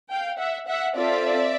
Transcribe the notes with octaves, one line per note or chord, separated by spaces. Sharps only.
F5 G5
E5 F#5
E5 F#5
C4 F4 A4 D5 E5